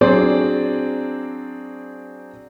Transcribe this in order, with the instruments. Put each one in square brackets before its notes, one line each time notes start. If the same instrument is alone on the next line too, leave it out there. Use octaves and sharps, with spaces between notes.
[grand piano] F#3 C4 D4 G#4 C5 D5